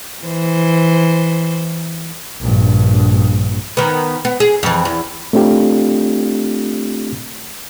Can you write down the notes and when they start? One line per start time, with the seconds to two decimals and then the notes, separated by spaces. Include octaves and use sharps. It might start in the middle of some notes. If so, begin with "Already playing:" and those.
0.24 E3 C5
2.41 A#1 G2
3.77 D#3 B3
4.25 B3
4.40 G#4
4.63 F2 E3
4.85 E2
5.33 A3 C4 D4 F4 G4